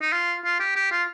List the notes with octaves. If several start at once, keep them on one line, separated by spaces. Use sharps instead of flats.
D#4
F4
F4
G4
G4
F4